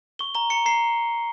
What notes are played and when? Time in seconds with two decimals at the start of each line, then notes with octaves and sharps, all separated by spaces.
0.19 C#6 G7
0.35 A#5 G7
0.50 A#5 C#7
0.66 A#5 C7